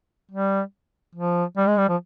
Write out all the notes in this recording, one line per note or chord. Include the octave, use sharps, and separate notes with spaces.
G3
F3
G3
G#3
G3
F3